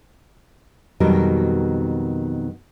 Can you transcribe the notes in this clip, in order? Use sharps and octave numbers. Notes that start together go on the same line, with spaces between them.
F2 B2 D#3 F#3 G3 A#4